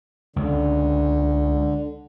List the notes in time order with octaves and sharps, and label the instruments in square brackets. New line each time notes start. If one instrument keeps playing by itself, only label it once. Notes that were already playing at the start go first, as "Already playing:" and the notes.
[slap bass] C#2 [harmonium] D3